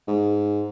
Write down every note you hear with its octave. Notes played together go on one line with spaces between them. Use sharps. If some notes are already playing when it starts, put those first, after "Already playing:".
G#2